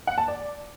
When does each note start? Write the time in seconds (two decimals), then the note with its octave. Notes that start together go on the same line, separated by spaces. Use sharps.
0.07 F#5
0.18 A5
0.28 D5